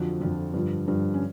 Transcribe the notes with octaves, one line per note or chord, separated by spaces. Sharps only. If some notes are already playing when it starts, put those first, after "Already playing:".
Already playing: F2 D3 F3 F#4
F2 D3 F3 F4
G2 D3 F3
G2 D3 F3
C#4